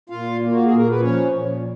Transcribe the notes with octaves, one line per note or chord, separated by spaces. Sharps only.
A#2 F4 F5
A#3
F#4
G#4
A#2
A#4
B4
F3 C#4 C#5
A#2